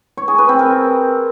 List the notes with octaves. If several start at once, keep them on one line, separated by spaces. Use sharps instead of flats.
C#5
G#4
B4
C4
A#4